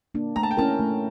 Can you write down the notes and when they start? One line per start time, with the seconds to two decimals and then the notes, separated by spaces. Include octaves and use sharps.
0.15 A#3 D4
0.36 A3 A#5
0.43 A5
0.51 G5
0.57 C#4 E4 A#4 A5
0.79 A3